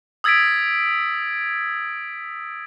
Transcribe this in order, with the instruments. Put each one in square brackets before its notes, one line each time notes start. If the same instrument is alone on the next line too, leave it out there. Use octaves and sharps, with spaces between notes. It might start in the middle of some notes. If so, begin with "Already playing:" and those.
[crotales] D#6 E6 G#6 A6 B6 D7